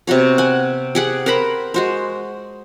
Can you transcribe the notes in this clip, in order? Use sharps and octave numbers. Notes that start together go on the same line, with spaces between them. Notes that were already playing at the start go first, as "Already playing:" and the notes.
C3 B3 F#4 C#5
F#5 G#5
G4 G#4 F#5
A#4 C5 F#5 B5
G#3 F#4 C5